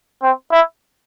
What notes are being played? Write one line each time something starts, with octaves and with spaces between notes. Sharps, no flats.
C4
E4